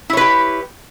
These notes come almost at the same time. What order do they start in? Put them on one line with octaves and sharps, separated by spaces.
E4 C#5 B4 G4